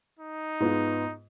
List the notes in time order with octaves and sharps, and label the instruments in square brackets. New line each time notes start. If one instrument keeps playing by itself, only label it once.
[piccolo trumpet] D#4
[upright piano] G#2 B3 F4